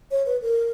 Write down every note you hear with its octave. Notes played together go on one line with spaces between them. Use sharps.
C#5
B4
A#4